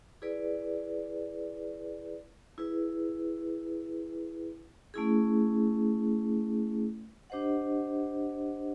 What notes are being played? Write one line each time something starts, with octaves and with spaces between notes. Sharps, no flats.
E4 G#4 B4 D5
E4 G#4 B4
A3 C#4 E4 G#4
D4 G4 C5 D#5 F#5